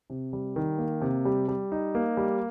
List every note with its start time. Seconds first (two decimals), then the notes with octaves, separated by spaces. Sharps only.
0.10 C3
0.33 G3
0.56 D#3
0.78 A#3
1.01 C3
1.25 G3
1.48 G3
1.72 D#4
1.95 A#3
2.17 G3